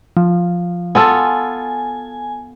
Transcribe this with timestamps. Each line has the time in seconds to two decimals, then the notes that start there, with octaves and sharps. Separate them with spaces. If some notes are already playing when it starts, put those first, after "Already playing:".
0.17 F3
0.95 B3 F4 A4 G#5